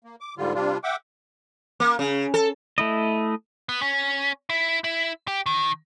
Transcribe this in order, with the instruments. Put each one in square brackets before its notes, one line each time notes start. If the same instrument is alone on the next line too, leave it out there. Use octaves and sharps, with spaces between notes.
[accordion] A#3
D6
G#2 D3 G3 F4
C3 G3 D4 F4
E5 F#5 G5 D6
[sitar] A#3
C#3
A4
[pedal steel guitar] A3 E4 D#5
[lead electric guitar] B3
C#4
E4
E4
G4
D#3